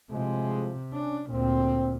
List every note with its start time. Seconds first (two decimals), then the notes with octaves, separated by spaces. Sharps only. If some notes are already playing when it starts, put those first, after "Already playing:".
0.11 A2 C3 F3 G#3
0.94 C#4 D4
1.31 D2 A#2 C4